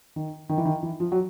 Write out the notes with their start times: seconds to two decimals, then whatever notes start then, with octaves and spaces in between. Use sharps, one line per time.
0.16 D#3
0.49 D#3
0.58 E3
0.65 D#3
0.83 E3
1.00 F3
1.12 F#3